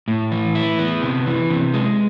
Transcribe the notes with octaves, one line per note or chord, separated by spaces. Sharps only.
A2
E3
E4
B3
C3
E3
C3
G#3